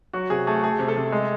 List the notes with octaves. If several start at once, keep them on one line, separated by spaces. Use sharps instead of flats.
F#3 F#4
C3 G#4
A3 G#4
A3 G#4
C3
A4
C3
G#3